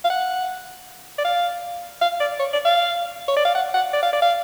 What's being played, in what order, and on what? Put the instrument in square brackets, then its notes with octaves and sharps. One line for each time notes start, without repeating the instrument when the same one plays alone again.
[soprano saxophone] F5
F#5
D5
F5
F5
D5
C#5
D5
F5
C#5
D5
F5
F#5
F#5
D5
F5
D5
F5